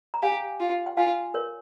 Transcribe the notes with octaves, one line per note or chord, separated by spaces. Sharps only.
A#5
G4 F5 G#5
F4
G5
F4 F5 G#5
A#4 C#5